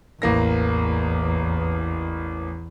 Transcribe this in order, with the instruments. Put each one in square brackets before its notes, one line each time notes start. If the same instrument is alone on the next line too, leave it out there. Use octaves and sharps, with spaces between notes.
[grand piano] A1 A#3 A#6 [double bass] E2